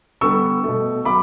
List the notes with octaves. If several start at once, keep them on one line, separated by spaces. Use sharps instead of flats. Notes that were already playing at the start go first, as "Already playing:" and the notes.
D3 G3 B3 C#6 E6
B2 A3
F#3 B3 B5 D6